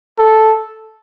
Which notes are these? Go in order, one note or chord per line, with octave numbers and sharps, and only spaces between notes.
A4